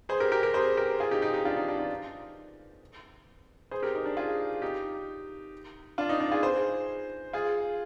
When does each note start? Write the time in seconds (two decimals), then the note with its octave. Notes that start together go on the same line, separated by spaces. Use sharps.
0.09 G#4 C5
0.20 G4 A#4
0.32 G4 A#4
0.43 G4 A#4
0.54 G#4 C5
0.77 G4 A#4
1.00 F4 G#4
1.11 D#4 G4
1.22 D#4 G4
1.34 D#4 G4
1.45 D4 F4
1.57 D#4
1.68 D4
1.79 D4 F4
3.71 G#4 C5
3.82 G4 A#4
3.94 D#4
4.06 D4
4.17 F4 G#4
4.62 D#4 G4
5.98 D4 F4
6.09 D#4
6.20 D4 F4
6.32 F4 G#4
6.43 G#4 C5
7.33 F4 G#4